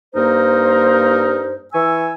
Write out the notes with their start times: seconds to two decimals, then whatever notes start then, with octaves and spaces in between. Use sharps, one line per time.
0.15 G2 A#3 D#4 A#4 C5
1.73 E3 G#5 C#6 E6